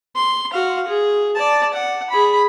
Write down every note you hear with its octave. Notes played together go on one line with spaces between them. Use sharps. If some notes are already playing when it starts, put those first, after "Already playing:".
C6
F#4 F5
G#4
D5 A5
F#5
G#4 B5